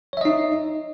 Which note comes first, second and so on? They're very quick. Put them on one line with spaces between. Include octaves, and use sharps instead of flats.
C#5 E5 D#5 D#4